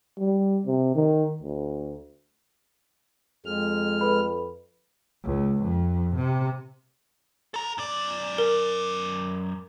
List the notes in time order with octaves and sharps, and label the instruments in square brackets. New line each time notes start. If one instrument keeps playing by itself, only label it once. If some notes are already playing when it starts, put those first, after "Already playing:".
[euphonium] G3
C3
D#3
D2
[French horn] F2 [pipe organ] G#3 F6
[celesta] A4 B4 B5
[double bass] C#2
F2
C3
[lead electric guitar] A4 A#5
F#2 D5
[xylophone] A#4